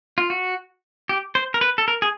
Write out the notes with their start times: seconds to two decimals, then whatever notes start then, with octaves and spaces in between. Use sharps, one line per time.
0.18 F4
0.30 F#4
1.09 G4
1.35 C5
1.54 A#4
1.61 B4
1.78 A4
1.88 A#4
2.02 G#4